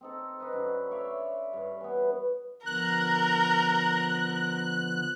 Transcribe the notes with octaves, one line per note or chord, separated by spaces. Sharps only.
C4 D#4 A4
D#4 B4
F#2 D3
C#5 D5 E5 F5
G2 C#5
E3 B3
D3 F3 B3 A#4 F#6